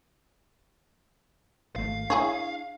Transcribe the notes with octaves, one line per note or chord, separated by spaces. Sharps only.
G#1 A3 F5
D4 E4 G#4 C#5